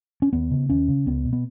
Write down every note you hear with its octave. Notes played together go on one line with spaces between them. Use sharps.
C#4
D#2 B3
C#3
D#2 C#4
C#3
C#2 B3
B2
B3